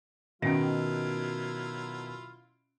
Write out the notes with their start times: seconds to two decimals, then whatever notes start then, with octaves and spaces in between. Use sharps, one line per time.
0.42 B2 D#3 F#3 C#4 E4 F4 E5 D7